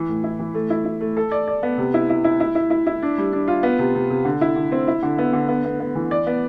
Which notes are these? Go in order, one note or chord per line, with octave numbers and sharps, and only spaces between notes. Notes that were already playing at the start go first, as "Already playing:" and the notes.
Already playing: E3
A2
E4
E3
A3
E4
E4
A3
A4
D5
D5
B3
C3
E4
E4
E4
E4
E4
E4
E4
D4
G3
D4
F4
B3
C3
C3
C3
D3
E4
D3
C4
E4
D3
B3
D3
B3
B3
B3
E3
D5
B3